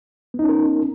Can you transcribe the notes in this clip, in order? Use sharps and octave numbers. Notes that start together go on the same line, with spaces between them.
B3 C#4 D#4 A#4